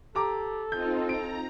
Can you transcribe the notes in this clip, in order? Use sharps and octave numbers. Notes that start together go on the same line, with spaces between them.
G4 A4 A#5 D6
C4 D#4 F4 G6
A#5 D7